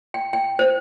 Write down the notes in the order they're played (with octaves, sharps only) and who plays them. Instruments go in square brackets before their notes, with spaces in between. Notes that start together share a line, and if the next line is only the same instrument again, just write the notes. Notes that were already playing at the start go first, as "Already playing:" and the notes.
[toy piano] G5
G5
C5